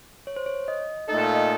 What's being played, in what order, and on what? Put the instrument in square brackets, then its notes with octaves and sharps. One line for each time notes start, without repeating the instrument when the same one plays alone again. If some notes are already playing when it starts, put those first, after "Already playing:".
[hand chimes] C#5
C5
C#5
D#5
[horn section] A#2 A3 D#4 A4 [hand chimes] D#5
[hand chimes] F5
D#5